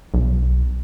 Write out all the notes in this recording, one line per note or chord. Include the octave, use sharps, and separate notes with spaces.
B1